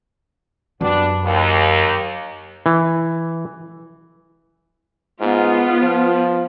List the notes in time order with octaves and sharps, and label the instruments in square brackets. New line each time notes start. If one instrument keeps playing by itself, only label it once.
[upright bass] F#2 [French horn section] G3 B3 D4
[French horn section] D#2
[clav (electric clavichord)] E3
[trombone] G#2 [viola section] B3 F4
[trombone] F3